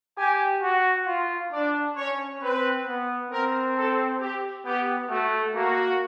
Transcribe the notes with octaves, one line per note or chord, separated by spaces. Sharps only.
G4 G#5
F#4
F4
D4 D5
C#4 C#5
C4 B4
B3
C4 A#4
A4
G4
B3 G4
A3 F#4
A#3 F#4